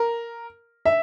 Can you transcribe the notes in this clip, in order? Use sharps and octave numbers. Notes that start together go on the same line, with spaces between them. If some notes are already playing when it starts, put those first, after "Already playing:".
Already playing: A#4
E5